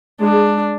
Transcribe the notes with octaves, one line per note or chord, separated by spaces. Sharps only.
G#3 D4